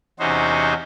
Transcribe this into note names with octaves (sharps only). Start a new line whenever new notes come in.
E2 C3 C#4 D#4 F#4 C5